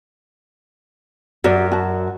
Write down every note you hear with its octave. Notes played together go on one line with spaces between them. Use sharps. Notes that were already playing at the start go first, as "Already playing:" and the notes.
F#2 F#4 D5
F#4 A5